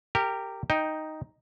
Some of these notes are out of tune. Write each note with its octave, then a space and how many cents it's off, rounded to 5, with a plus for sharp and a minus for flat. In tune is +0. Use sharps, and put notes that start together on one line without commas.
G4 +0 A#4 -20
D#4 +0 G5 +0